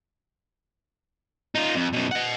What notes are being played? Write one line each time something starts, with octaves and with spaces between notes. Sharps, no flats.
D#4 F4
F2
F#2 B2
D#5 F#5